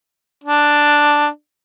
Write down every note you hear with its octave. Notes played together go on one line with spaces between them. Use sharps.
D4